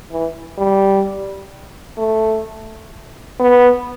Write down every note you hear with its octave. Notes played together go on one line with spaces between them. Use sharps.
E3
G3
A3
B3